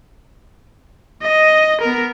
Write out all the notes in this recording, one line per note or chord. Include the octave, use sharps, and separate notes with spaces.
D#5
B3 A#4